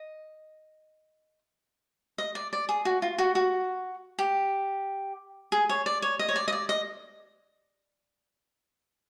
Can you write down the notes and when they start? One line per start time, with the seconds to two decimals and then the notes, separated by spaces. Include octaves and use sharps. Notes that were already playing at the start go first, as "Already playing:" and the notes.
Already playing: D#5
2.18 D#5
2.35 D5
2.53 D5
2.69 G#4
2.85 F#4
3.02 F4
3.18 F#4
3.35 F#4
4.19 G4
5.52 G#4
5.69 C#5
5.86 D5
6.02 C#5
6.19 D#5
6.28 C#5
6.36 D5
6.48 D#5
6.53 D5
6.69 D#5